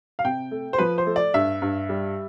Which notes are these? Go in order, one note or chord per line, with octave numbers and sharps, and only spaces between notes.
F5
C3 G5
A3
C5
F3 B4
C5
A3
D5
G2 E5
G2
G3